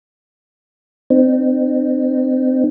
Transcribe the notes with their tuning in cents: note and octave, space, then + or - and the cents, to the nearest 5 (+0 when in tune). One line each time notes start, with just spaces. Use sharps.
C4 -20 D#4 -45